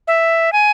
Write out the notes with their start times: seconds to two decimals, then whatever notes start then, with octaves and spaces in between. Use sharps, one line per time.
0.08 E5
0.53 G#5